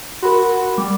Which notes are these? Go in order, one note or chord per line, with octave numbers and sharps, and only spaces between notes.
F#4 A#4 B5 C6
G3 D6